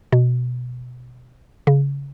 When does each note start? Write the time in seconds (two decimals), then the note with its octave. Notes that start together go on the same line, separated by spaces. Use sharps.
0.12 B2
1.67 C#3